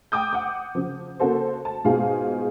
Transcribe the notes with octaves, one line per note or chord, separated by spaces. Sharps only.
G5 D6 D#6 G6
F#5 D6
C#3 F3
C#3 A#3 F#4 A4 C5
A5
G#2 B2 F4 G#4 F5